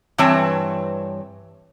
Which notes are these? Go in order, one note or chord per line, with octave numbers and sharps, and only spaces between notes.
G2 E3 C4 C#5 A5